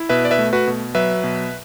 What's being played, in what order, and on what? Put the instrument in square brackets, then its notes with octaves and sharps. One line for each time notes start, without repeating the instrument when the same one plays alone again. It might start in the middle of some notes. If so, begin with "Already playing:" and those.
Already playing: [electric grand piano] E4
B2 B4 E5
D5
B4 E5
A3
F#4 B4
B2
F#3 B4 E5
B2